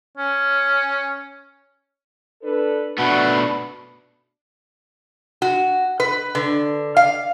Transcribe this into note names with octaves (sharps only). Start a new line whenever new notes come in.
C#4
D4 A4 B4
B2 A3 D4 F#4 B4 F#5
F#4
B4
D3
F5